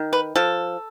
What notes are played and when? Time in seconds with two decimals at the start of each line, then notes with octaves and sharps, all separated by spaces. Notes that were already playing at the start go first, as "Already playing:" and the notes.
Already playing: D#3
0.13 B4
0.36 F3 A4